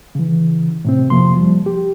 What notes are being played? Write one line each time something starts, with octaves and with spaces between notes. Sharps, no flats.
C#3 E3
A2 C3 C4
F2 C3 F3 A#3 C6
F3 G3
G4